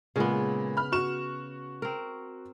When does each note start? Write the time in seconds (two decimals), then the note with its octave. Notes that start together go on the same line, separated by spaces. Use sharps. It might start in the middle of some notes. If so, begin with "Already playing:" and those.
0.16 A#2 C#3 G#3 A#3 B3
0.77 B5 F6
0.92 F#4 C#6 E7
1.82 C4 A#4